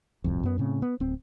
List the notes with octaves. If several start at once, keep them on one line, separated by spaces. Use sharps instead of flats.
D1 C2 F2
F#2 B3
A2 C#3 C4
B3
D1 C4